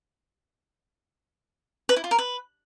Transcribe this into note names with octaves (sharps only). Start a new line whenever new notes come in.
B4
E4
F4
A#4
B4